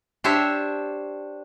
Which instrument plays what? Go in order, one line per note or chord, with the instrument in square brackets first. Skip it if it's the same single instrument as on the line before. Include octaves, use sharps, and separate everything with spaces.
[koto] D4 G4 C5 C#5 E5 A5